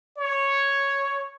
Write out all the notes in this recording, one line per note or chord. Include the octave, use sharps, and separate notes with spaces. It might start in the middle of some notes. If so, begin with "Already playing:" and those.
C#5